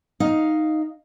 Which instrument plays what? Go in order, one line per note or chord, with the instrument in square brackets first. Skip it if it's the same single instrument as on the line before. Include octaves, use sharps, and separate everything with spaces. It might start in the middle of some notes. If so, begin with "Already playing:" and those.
[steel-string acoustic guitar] D#4 F5